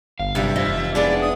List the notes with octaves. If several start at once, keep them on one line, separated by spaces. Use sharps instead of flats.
G1 F5
G2 C3 F#3 G3 E5
F1 F3 G4 D#5
G#3 B3 D4 E4 D5
D#6